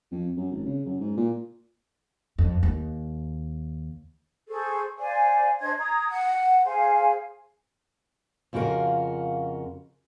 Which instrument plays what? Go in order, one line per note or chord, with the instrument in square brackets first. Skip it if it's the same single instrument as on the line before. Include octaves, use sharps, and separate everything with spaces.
[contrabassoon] F2
F#2
G#1
C#3
F#2
G#2
A#2
[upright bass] F2
D#2
[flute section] G#4 A4 C5 C#6
C5 D5 F5 G#5
D4 C5 D#5 G#6
A#5 D#6 G#6
F#5
G#4 C5 F5 G#5
[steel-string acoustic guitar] F2 C#3 F4 F#4 A#4 F5